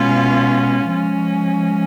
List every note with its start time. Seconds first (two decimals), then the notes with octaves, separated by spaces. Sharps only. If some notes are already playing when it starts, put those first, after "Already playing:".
Already playing: B2 G#3 C#4 F4
0.89 F3 G#3 C#4